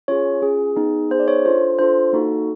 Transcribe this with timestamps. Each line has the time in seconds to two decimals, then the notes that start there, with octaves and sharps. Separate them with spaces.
0.08 C#4 F4 G#4 C#5
0.42 C#4 F4 G#4
0.76 B3 D#4 G#4
1.11 B3 D#4 G#4 C5
1.20 D5
1.28 C#5
1.45 D4 F4 A4 C5
1.79 D4 F4 A4 C5
2.13 A#3 D#4 F#4 A4